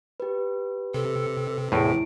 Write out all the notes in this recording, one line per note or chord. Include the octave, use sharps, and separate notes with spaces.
G4 B4
C3 A4
E2 A2 E4 D7